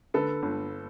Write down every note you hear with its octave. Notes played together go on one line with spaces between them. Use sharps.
D3 A4 B4
G1